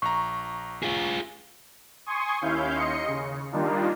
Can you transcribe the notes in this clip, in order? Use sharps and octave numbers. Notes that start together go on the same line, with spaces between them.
A#1 A#5 C#6
F4 G#4
G#5 C6 C#6 D#6
D#2 C#4 E4 F5 G6
D#2 D#5 C6 C#7
C#3
D#3 G3 A#3 D4 D#4 F4